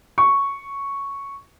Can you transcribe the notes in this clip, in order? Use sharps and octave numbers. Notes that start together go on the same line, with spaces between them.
C#6